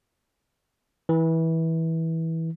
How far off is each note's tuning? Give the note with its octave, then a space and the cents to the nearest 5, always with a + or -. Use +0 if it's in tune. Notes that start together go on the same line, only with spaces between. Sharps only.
E3 -20